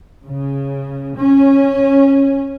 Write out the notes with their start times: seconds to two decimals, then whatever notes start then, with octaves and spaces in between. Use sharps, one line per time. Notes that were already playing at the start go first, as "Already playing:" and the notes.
0.23 C#3
1.16 C#4